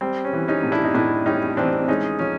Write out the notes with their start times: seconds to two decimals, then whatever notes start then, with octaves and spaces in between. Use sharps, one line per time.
0.01 G3 C4
0.25 C#4
0.33 E3
0.48 C#4 D#4
0.63 A2
0.72 D4 E4
0.84 D#4
0.94 A2 D4 E4
1.26 G3 C#4 D#4
1.57 E3 C4 D4
1.88 G#3 C#4 D#4
2.19 F3 C#4